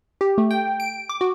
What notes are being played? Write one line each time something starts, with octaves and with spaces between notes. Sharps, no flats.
G4
A3
G5
D7
D6
F#4